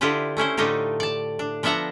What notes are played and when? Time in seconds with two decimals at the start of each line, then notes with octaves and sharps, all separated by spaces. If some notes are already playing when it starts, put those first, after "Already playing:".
0.01 D3 E4 F4 G4 B4 C5
0.37 A3 C#4 E4 C5
0.57 A2 D3 A3 D#4 F4 G4
1.00 D5 A5
1.39 D4
1.63 F3 B3 D4 E5 F#5 A#5